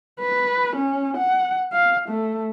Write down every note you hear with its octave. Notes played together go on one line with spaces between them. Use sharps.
B4
C#4
F#5
F5
A3